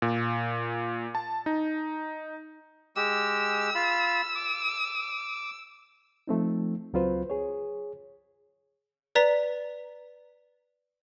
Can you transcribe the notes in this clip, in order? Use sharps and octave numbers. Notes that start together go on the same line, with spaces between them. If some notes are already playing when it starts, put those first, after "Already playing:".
A#2
A5
D#4
G#3 G4 E6
F4 B5
D6
F3 A3 C4 D#4
C#2 F#3 C4 F4 B4 C5
G#4 C#5
B4 D5 A#5 B6